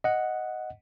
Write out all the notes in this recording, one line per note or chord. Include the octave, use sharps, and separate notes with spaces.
D#5 F#5